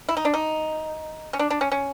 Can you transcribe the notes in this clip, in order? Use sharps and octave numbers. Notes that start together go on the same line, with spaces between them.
E4
D#4
D4
D#4
C#4
D4
D4
C#4
C#4